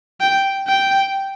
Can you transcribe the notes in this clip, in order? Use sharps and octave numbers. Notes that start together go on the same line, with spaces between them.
G5
G5